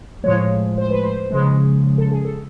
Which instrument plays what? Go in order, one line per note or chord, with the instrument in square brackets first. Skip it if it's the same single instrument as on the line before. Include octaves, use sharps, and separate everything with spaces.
[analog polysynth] A2 F3 G#3 C#5
C5
B4
C5
C#3 F3 G#3
A4
G#4
A4